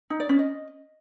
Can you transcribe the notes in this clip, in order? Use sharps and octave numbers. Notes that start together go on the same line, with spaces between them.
D#4
D5
C#4
D#5